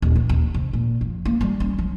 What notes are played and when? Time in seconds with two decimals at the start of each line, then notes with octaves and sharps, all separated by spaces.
0.02 D#1
0.16 E2
0.29 D#2
0.54 C3
0.73 A#2
1.01 F2
1.25 A#3
1.41 G3
1.60 C#4
1.78 F#3